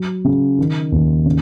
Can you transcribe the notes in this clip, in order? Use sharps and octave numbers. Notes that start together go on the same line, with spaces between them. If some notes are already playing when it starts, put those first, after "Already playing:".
Already playing: F#3
C#3
D#3
D#2
C#3